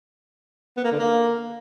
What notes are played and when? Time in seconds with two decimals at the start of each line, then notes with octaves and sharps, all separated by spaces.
0.77 B3
0.84 A#3
0.91 D3
0.99 A#3